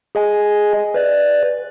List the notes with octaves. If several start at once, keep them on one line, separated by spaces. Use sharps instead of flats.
G#4 D#5 G#5
B4 D5